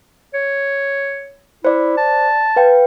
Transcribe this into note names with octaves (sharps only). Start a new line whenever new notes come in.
C#5
E4 C5 D5
A5
B4 F5 G5